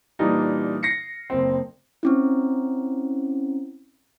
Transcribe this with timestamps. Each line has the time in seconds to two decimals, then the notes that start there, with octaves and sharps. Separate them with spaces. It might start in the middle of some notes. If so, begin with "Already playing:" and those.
0.19 A#2 E3 G3 D4 D#4
0.83 A#6 C7 C#7
1.30 F#1 C4
2.03 C4 C#4 E4